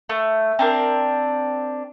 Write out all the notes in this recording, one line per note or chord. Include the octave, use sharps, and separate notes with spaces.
A3
C4 D4 A#4